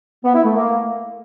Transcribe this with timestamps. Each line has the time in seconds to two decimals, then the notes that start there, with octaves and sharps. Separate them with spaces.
0.25 B3
0.35 E4
0.45 A3
0.55 A#3